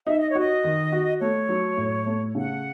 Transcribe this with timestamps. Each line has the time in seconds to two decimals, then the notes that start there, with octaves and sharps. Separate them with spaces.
0.07 D#4 E5
0.17 D#5
0.29 C#5
0.35 F#4 D#5
0.64 D#3
0.92 F#4
1.20 A3 C#5
1.49 F#3
1.77 A2
2.06 A3
2.35 C#3 F#5